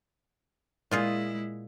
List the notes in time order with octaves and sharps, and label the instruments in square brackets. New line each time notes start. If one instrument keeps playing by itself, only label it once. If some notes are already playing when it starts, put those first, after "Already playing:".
[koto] A#2 F4 G#4 [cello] G#3 E4